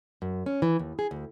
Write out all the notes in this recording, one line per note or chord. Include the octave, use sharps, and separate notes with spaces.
F#2
C#4
E3
D#2
G#4
D2